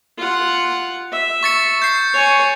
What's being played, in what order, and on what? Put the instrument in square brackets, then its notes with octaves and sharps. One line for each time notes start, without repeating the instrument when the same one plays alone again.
[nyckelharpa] F4 F#5
E5
[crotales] C#6 A6 C#7
G6 C7
[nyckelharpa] C#5 G#5